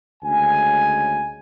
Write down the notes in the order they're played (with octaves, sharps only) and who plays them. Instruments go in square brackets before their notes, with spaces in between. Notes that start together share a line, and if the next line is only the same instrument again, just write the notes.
[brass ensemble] D2 C#3 G#3 C#4 G#5